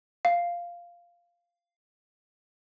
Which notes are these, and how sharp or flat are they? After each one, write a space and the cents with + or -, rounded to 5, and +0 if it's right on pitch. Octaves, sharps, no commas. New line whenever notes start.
F5 -5